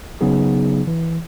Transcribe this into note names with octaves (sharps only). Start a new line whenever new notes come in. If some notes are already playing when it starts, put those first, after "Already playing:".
C#3 F#3 B3 D#4 G#4
E3